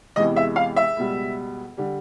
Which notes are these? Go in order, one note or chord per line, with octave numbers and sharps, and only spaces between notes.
E2 C3 E3 G#3 D#5
E5
F5
E5
C#2 B2 G3
D3 G3